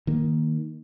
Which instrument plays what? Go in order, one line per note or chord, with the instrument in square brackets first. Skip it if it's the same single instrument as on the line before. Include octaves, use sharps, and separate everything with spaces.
[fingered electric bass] D#3 A#3